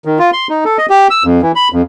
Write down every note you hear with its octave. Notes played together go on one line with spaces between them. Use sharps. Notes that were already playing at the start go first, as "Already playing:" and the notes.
D#3
F4
C6
D#4
A4
D#5
G4
E6
F2
E3
B5
F2